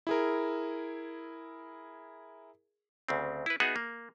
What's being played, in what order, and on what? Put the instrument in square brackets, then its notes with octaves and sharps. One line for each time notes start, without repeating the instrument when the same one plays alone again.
[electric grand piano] E4 G#4 A#4
[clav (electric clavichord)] D2 C#3 C4
E4 B4
B3 D#4 F#4 G#4 E5 F#5
A#3